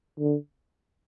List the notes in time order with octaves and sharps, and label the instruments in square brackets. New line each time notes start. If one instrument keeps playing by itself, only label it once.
[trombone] D3